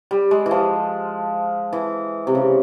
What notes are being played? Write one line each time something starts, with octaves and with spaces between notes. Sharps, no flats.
G3
G#3
E3
F3
E3
C3
C#3